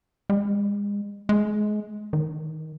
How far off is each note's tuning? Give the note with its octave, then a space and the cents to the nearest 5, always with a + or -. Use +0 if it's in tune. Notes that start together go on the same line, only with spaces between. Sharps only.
G#3 -35
G#3 +25
D#3 +15